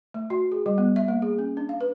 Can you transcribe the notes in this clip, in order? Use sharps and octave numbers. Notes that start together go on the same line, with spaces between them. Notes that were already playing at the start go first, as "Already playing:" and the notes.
A3
F#4
G#4
G3
B3
E5
A#3
G#4
C#4
D4
F5
B4